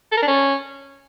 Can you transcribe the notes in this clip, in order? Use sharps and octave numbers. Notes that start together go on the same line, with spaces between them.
A4
A#4
D4
C#4